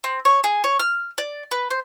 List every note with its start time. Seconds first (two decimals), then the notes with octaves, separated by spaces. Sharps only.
0.04 C4
0.25 C#5
0.44 G#4
0.64 C#5
0.80 F6
1.18 D5
1.51 B4
1.71 C5